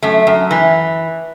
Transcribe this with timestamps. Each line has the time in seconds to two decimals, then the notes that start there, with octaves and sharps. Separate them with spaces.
0.02 F#2 A3
0.27 F#2
0.51 E3